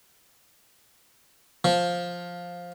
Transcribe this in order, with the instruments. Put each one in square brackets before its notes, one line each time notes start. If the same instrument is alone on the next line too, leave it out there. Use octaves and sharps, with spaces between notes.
[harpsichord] F3